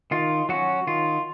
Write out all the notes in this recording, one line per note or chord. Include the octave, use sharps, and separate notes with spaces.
D#3 F4
F#3 C#4 F#4
D#3 F4